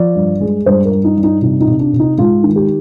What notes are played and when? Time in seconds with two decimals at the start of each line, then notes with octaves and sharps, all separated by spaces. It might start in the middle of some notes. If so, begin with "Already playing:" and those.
Already playing: F3 D5
0.16 G2
0.41 G#3
0.66 G2 C5
0.85 A#4
0.92 G2
1.04 D#4
1.17 G2
1.23 D#4
1.42 C3 D#4
1.60 D#4
1.67 C3
1.79 D4
1.93 C3
1.99 D#4
2.18 G#2 F4
2.44 D#3
2.56 G4